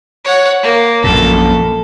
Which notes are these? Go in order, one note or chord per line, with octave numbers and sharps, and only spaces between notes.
C#5 F#5
A#3
A#1 F#2 A#2 A4